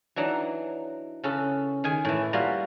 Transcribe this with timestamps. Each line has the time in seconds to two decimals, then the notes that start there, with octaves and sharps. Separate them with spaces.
0.16 E3 F#3 D4 D#4
1.24 C#3 C#4 A4 B4
1.84 D#3 G#4 G#5
2.05 A2 E3
2.33 G3 A#3 F4 F#4 D#5